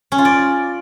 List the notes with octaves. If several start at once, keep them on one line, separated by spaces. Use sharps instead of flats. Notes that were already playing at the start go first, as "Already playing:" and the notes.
C#4
F4
D5